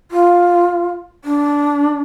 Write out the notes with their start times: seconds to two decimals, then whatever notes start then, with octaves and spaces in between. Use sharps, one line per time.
0.11 F4
1.25 D4